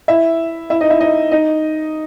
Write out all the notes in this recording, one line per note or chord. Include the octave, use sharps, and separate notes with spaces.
E4 E5
E4 E5
D#4 D#5
E4 E5
D#4 D#5
D#4 D#5